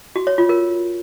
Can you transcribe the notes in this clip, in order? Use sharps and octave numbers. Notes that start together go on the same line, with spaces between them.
F#4
C#5
F4
A#4